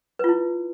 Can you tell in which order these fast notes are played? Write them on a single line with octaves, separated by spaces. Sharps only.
B4 F4 E4